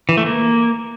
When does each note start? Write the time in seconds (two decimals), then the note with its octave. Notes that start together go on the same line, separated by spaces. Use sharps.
0.09 E3
0.17 A3
0.26 A#3